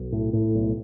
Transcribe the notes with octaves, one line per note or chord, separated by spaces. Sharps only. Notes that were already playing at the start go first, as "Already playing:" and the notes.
Already playing: B1
A2
A2
B1